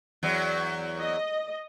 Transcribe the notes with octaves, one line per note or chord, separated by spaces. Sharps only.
E2 F#3
D#5